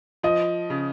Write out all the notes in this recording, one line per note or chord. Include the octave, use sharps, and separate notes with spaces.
F3 D#5
C#3